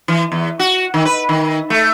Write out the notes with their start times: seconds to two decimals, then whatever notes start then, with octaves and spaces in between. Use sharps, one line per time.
0.08 E3
0.32 E2
0.59 F#4
0.94 D#3
1.05 B4
1.29 D#3
1.70 A3